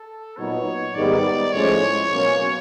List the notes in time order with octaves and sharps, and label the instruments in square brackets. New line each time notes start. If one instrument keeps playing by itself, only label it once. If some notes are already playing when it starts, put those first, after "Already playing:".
Already playing: [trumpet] A4
[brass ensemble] A#2 F#3 B3 D#4 [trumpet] C#5
[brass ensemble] G#2 D#3 G3 B3 D#4 [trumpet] D5
[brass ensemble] A2 F3 G#3 C#4 [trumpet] C#5
[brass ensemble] B2 F#3 A#3 C#4